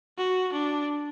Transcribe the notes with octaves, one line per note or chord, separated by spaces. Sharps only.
F#4
D4